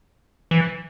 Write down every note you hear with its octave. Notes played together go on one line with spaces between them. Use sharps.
E3